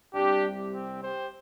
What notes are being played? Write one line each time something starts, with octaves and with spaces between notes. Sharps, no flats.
C2 C3 G3 D4 G4
C4
G4 C5